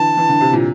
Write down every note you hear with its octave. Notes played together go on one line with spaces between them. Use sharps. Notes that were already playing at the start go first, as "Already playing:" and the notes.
Already playing: D3 E3 A5
E3
D3
C3
A#2